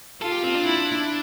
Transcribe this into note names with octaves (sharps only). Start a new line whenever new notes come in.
F4 A4
G4
C4
D4
E4